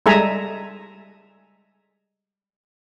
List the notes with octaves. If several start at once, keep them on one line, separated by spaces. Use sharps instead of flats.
G3 G#3 A4 E5 G#5 A#5